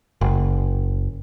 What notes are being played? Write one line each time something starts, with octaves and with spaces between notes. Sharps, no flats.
F#1